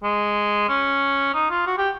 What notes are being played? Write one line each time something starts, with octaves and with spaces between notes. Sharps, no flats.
G#3
C#4
D#4
F4
F#4
G4